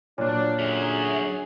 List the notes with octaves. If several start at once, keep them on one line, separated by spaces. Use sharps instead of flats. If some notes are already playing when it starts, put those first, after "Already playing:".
A#2 F#3 B3 D4 C#5 F#6
F#2 D3 F#3 G#4